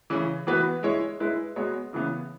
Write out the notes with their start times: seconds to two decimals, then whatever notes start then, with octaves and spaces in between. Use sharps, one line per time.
0.10 C#3 E3 C#4
0.47 E3 B3 F#4 B4
0.83 G#3 E4 C#5
1.20 G#3 E4 B4
1.56 G#3 B3 F#4 C#5
1.93 C#3 E3 B3